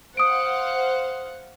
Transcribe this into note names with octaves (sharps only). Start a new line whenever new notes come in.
C5 F5 F#5 D#6 D7